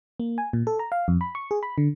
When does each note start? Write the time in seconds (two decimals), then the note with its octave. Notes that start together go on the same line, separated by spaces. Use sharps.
0.20 A#3
0.38 G#5
0.53 A#2
0.67 A4
0.79 A#5
0.92 F5
1.08 F2
1.21 B5
1.35 C#6
1.51 G#4
1.63 B5
1.78 D3